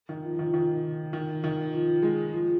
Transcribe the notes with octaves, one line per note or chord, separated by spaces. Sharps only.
D#3
F3
F3
D#3
D#3
D#3
D#3
F3
G#3
F3